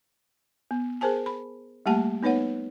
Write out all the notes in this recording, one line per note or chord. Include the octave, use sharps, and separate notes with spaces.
B3
G#4 A#4 C5 G#5 A5
B5
G3 A3 A#3 G4 F#5 A5
B3 D#4 B4 C#5 F#5